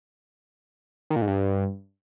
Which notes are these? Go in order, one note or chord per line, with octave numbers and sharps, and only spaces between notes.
D#3
A#2
G#2
G2